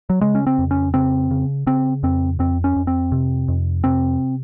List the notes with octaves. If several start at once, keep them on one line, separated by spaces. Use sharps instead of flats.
F#3
C#3 G#3
C#4
C4
F2
C#4
C#3 C4
C#3
C#3 C4
F2 C4
F2 C4
C#4
F2
C4
C3
F2
C3 C4